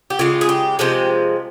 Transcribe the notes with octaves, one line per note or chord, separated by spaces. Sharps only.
G4
C#3 G#3 F4
G#4
G4
C3 F3 G#3 G4